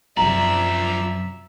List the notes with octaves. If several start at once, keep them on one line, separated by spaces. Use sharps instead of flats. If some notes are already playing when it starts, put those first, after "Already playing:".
F#2 C3 F3 D5 E5 A#5